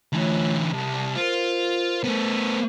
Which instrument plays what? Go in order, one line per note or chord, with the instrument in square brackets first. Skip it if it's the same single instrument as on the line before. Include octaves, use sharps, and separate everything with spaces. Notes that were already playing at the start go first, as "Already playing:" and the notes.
[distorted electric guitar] D3 E3 [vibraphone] A3 F4 C#5
[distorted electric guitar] C2 [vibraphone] A5
[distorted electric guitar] F4 [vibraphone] A#4 C5
[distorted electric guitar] A3 B3